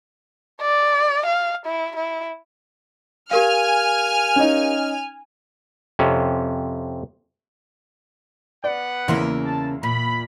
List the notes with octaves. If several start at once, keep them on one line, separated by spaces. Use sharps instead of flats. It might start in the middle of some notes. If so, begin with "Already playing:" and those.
D5
F5
E4
E4
G4 A#4 F5 G#5 F6
C#4 D#4
F2 C3 C#4
B3 B4 D5 F#5
E2 C#3 A#3 C#4 E4 C6
A5
A#2 B5